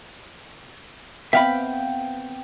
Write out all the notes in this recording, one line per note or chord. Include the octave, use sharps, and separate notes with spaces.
B3 C4 E5 F5 G5 B5